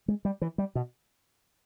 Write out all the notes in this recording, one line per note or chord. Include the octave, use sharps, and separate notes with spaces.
G#3
G3
E3
G3
B2